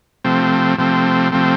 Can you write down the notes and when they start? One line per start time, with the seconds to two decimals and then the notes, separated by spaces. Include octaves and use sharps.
0.24 C3 F3 A3 C4
0.78 C3 F3 A3 C4
1.32 C3 F3 A3 C4